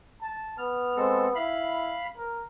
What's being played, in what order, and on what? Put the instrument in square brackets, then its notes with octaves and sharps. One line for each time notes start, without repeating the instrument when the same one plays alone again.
[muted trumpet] A5
[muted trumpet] B3 [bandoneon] F6
[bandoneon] G#3 C4 A4
[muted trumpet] E4 [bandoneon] F5 B5
[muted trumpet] A#4